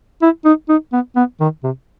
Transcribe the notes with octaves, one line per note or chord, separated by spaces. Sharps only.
E4
D#4
D#4
B3
B3
D#3
C3